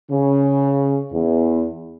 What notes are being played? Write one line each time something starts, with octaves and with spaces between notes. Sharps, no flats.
C#3
E2